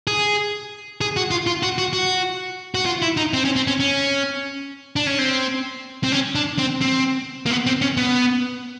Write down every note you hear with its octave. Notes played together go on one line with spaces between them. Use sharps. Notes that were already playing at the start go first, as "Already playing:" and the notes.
G#4
G#4
F#4
F4
F4
F#4
F#4
F#4
F#4
F4
E4
D#4
C4
C#4
C4
C#4
C#4
D4
C#4
C4
C4
C#4
D4
C4
C4
A#3
B3
C4
C#4
B3